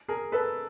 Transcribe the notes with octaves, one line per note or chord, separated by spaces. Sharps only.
G#4 A#4
A4 B4